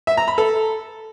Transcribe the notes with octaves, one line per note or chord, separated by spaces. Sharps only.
E5
A#5
B5
A4